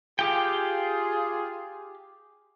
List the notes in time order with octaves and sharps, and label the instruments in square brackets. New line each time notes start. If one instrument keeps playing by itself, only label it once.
[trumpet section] F4 G#4 [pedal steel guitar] G4 G5